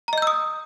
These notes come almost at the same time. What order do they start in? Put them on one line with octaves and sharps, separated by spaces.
A#5 D#5 G6 E6 D#6